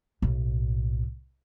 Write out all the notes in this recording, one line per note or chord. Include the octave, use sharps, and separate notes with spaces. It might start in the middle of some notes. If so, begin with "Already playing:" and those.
B1 A2